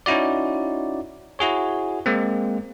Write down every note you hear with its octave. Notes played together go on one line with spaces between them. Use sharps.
C#4 D#4 E4 F#4 D5
E4 F#4 G#4 C#5
G#3 A#3 C4